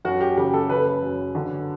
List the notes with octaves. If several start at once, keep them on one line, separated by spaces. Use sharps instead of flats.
F#2 F#4
G4
C#3 G4
A4
C#3 B4
F#2
D3